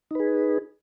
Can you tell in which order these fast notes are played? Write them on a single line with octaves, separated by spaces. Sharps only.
D#4 B4 G#4